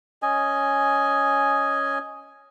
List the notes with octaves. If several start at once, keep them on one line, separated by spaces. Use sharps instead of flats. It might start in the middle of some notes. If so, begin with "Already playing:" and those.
C#4 D#5 G#5